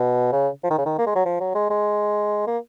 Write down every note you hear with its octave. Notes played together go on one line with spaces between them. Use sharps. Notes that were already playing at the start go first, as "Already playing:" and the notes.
Already playing: B2
C#3
F3
D#3
C#3
D#3
A#3
G#3
F#3
F3
F#3
G#3
G#3
A#3